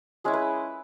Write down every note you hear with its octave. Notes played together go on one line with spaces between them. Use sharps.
G#3 C#4 E4 G#4
B4